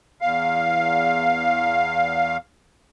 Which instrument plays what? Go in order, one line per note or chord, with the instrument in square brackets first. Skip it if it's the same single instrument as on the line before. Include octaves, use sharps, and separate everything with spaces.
[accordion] E2 F5